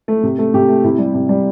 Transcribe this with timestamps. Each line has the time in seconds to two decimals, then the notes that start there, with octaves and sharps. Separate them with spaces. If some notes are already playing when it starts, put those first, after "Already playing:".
0.08 A3
0.23 C3
0.38 A3
0.54 C3 G4
0.68 A3
0.84 C3 E4
0.98 G3
1.14 C3
1.29 G3